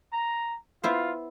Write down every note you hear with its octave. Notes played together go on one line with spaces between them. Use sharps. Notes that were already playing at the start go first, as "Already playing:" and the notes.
A#5
B3 E4 F4 C5